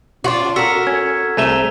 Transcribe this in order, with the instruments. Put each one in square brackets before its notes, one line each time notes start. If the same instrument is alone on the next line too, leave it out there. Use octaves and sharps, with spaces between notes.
[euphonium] C#4 [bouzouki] D4 F4 F#4
[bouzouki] F#4 A#4 [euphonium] A4 [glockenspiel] E6 B6 E7
[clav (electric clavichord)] C#4 [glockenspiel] G#6
[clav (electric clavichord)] C2 A3 E5 [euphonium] G#4 [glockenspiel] G#5 A#5 G7